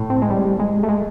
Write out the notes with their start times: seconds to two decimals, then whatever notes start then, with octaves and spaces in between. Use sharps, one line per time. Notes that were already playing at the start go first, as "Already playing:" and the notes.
Already playing: A2
0.10 C4
0.22 G#3
0.30 G3
0.59 G#3
0.83 A3
0.89 G#3